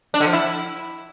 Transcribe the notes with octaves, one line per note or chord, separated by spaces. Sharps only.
D4
D3
F3
E4